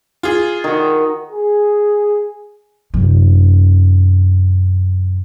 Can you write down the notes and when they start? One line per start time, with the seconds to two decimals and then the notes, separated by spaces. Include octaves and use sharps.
0.23 F4 G#4
0.64 D#3 F#4
1.31 G#4
2.94 F#2 C3